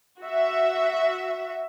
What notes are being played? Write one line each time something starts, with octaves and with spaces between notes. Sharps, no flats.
F#4 E5